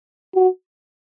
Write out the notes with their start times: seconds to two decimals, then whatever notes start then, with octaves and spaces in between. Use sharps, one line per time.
0.35 F#4